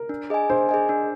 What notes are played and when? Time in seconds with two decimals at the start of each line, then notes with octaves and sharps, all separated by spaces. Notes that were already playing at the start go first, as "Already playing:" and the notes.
Already playing: A#4
0.09 D4
0.30 G#4 D#5 G#5
0.50 D4 C5
0.69 G#4 D#5 G#5
0.89 D4